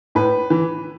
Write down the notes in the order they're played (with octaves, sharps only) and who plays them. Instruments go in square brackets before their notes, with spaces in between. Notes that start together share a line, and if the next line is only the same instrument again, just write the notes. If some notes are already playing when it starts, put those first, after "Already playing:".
[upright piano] A2 B4
E3